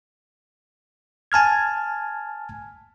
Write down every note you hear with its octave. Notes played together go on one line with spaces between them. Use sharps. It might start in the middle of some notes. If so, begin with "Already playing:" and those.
G#5 A5 F6 G#6